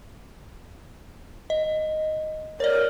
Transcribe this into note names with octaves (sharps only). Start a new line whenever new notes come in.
D#5
A#4 C#5 D5